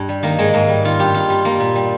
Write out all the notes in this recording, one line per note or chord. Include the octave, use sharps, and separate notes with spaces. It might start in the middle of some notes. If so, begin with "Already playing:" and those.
Already playing: G2
G3
D#3 A#3
G#2 G#3
G#2 A#3
G3
D#3 F4
G2 G4
G2 F4
G3
G3 A#3
A#2
G3